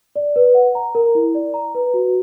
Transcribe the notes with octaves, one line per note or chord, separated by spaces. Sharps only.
D5
B4
F#5
A#5
A#4
E4
D5
A#5
B4
F#4